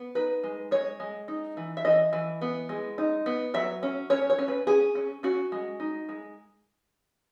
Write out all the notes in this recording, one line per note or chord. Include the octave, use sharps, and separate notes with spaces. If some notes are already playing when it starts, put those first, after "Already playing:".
Already playing: B3
D#4 B4
G#3
G#3 C#5
G#3
D#4
E3
E5
E3 D#5
E3
B3
G#3
D#4
B3
F#3 E5
C#4
C#4 C#5
C#5
C#4
B4
C#4 G#4
C#4
C#4 F#4
G#3
D#4
G#3